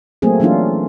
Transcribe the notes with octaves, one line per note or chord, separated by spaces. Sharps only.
F#3 A3 A#3 C4 G#4
E3 F#3 A#3 C#4 D4 F4